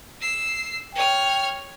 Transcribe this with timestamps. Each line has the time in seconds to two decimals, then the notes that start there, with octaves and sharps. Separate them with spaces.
0.21 E6 C7
0.95 C#5 G5 F6